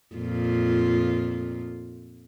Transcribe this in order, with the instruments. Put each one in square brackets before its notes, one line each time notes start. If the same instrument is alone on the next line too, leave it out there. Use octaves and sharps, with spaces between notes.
[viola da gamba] F2 A#2 F4